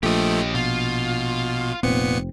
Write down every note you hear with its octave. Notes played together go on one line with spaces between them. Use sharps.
A#1 F3 A3 G4 D#5
B2 F4
F1 A#2 B3 C4 C#7